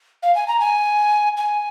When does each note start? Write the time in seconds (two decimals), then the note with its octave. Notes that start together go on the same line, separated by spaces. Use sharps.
0.23 F5
0.35 G#5
0.48 A#5
0.60 G#5
1.37 G#5